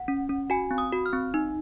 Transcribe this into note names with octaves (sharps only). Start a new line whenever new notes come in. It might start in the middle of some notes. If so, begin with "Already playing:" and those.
Already playing: F#5
C#4
C#4
F#4 G#5
C4
D#6
F#4
F6
C4
D#4